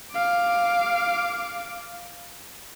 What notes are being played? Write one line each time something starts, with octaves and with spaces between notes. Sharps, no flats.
F5 D6